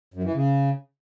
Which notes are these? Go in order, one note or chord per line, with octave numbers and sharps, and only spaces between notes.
F#2
E3
C#3